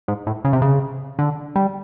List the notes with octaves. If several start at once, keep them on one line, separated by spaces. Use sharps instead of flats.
G#2
A2
C#3
C3
C#3
D3
G3